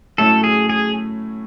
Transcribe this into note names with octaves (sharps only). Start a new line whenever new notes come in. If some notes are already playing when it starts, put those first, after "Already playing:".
A2 F#3 A3 C#4 E4 A4
G#4
G#4